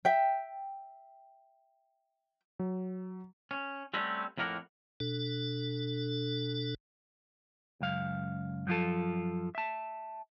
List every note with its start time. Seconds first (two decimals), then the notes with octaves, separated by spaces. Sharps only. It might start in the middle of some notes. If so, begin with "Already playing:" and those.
0.05 E5 G5
2.59 F#3
3.51 C#4
3.94 G3 A3 C4 C#4 F#4
4.38 F2 A2 A#3 A#4 F#5
5.00 B2 D4 A4
7.80 C#2 F#2 F5
8.67 F#2 F3 F4 A4
9.55 E5 A5